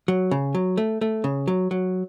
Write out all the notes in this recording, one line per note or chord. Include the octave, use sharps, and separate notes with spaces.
F#3
C#3
F#3
A3
A3
C#3
F#3
F#3